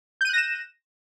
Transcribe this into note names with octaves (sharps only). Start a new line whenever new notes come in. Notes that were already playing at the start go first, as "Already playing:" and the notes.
F#6 G6 A#6 D#7 E7